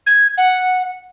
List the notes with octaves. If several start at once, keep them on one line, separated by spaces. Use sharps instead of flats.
G#6
F#5